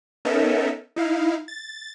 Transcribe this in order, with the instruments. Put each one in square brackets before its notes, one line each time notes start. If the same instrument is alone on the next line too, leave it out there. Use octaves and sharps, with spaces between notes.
[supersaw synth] B3 C#4 D#4 A4 A#4 E5
D#4 E4 F5
A6